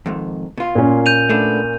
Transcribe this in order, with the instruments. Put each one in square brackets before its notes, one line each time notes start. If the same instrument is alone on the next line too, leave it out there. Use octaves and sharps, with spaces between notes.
[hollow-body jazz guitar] F2 G#2 D#3
B2 F4
[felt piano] A#2 A#3 C#4
[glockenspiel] G6 D#7 F7
[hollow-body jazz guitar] A3 B3 D4